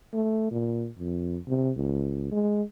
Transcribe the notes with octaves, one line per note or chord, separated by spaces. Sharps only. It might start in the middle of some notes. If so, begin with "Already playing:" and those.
A3
A#2
F2
C3
C#2
G#3